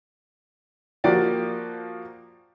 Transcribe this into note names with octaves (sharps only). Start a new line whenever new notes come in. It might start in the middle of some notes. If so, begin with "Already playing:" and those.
F3 A#3 F#4 G4 D5